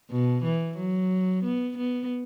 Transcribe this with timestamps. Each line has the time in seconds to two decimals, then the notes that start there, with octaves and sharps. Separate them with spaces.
0.10 B2
0.44 E3
0.77 F#3
1.44 B3
1.78 B3